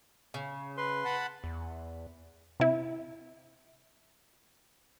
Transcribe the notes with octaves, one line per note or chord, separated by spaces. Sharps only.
C#3
B4 C6
F#5 A5 B5
E2
C3 E4